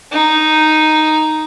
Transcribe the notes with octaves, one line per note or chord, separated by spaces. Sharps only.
D#4